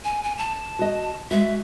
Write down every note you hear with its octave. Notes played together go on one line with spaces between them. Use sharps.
G#5
G#5
A5
F#4 D#5
G#3 F#4 E5